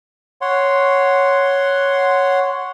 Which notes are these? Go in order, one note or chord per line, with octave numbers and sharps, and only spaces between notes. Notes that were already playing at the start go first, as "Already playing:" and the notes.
C#5 F#5 C6